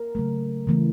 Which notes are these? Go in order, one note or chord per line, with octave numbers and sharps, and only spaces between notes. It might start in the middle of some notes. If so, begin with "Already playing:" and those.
Already playing: A#4
C#3 F#3 A3
C#3 E3 A3